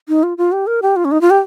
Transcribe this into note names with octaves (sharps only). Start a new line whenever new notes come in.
D#4
F4
F4
G4
A#4
G4
F4
C#4
D#4
F4
G4